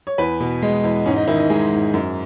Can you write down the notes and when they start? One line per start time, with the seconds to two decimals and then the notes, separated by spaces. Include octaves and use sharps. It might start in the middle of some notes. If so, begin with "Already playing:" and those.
0.07 C#5
0.18 E2 B4
0.40 B2
0.62 G#3
0.84 E2
1.06 G#2 C#4
1.16 D#4
1.28 D#3 E4
1.39 D#4
1.50 G#3 G#4
1.72 G#2
1.94 F#2